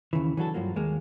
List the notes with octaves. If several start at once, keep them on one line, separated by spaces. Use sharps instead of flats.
D#2 C#3 E3
E3 F#3 D4 F#4 A4
G2 F3 F#3 A#3
D#2 G#3 A#3